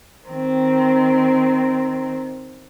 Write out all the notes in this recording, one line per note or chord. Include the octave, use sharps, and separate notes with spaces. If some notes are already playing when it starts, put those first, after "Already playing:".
D#3 C4